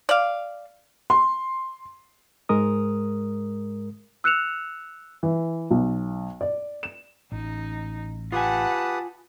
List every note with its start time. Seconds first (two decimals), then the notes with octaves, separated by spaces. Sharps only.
0.09 D5 F5
1.10 C6
2.49 G#2 G#3 A#4 D#6
4.24 E6 F#6 C#7 E7 F7
5.23 E3
5.71 B1
6.41 D5
6.83 E7
7.32 A1 D#4
8.32 F4 G4 B4 F#5 G#5 A5 D#6